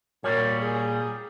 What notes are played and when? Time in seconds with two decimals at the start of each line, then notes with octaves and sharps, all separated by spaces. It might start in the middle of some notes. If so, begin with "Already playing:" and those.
0.24 A#2 G3 F#4 A#4 C#5
0.61 G#4